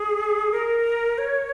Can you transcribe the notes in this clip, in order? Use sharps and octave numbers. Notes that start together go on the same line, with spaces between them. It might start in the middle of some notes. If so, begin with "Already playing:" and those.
Already playing: G#4
A#4
C#5